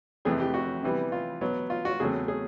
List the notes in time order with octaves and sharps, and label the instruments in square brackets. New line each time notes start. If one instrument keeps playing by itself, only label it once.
[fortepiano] F2 C3 E3 A3 C4 G#4
G4
F#4
C3 E3 G3 B3
F4
B2 F#3 B3
F4
F#4
E2 C#3 F#3 A3 C4 G#4
G#4